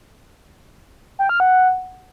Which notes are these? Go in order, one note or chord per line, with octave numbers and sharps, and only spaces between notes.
G5
F6
F#5